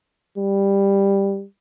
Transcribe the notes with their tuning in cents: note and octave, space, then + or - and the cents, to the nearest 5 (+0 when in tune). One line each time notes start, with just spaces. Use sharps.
G3 +10